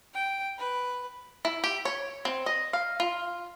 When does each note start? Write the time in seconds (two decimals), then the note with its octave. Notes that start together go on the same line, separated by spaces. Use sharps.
0.14 G5
0.58 B4
1.45 E4
1.64 G4
1.85 C#5
2.25 C4
2.46 D#5
2.73 F5
3.00 F4